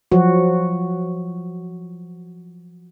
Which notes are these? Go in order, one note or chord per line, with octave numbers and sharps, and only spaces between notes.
F3 F#3 F#4